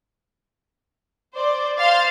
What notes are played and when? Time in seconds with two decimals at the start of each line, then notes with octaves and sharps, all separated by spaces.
1.35 C5 D5
1.78 C5 F5 A6